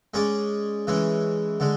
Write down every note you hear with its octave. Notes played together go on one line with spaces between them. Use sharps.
G#3 C#4 G#4 D5
E3 G#3 C#4
D3 G#3